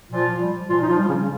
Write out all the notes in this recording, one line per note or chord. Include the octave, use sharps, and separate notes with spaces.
A#2 F3 F4
G3
A#2 F3 F4
D#4
F3 F4
G3
C#3 C#4